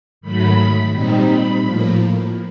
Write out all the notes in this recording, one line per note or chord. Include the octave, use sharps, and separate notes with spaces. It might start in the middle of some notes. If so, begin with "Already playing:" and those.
G#2 D#3 F#3 A3 B5
A#2 G3 C4 D#4
B5
A2 F3 A#3